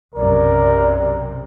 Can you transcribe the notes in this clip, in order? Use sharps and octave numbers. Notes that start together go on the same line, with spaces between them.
B1 F#2 C3 A#4 D5